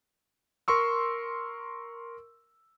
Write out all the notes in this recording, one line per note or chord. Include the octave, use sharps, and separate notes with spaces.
A#4 C6 C#6 E6